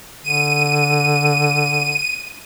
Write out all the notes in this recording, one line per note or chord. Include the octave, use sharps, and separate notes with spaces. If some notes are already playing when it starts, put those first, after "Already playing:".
D3 D#7